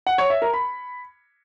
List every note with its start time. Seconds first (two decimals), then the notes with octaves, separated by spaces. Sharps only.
0.07 F#5
0.18 C#5
0.30 E5
0.42 A#4
0.54 B5